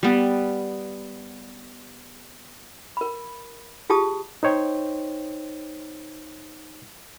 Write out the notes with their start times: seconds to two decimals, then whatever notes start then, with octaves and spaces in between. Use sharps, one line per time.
0.03 G3 B3
2.97 A#4 B5
3.90 F4 G4 G#4 A5 D#6
4.43 D#4 C5 C#5 G5